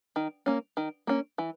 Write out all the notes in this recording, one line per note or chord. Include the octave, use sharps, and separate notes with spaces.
D#3
A#3 C#4
D#3
A#3 C#4
E3